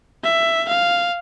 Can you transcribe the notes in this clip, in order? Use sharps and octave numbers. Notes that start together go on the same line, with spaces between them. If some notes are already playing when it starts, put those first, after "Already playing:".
E5
F5